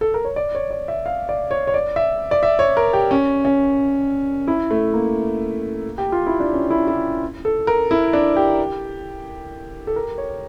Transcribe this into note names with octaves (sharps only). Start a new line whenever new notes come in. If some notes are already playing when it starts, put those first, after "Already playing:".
A4
A#4
C#5
D5
C#5
D5
E5
F5
D5
C#5
C#5
D5
E5
D5
E5
C#5
A#4
G4
C#4
C#4
E4
A3
A#3
G4
F4
E4
D4
C#4
E4
E4
A4
A#4
E4
D4
G4
A4
A#4
C#5